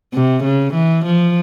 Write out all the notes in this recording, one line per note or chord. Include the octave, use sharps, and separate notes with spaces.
C3
C#3
E3
F3